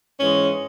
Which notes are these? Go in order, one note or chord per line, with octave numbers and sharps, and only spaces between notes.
G#2 E3 G#3 C#4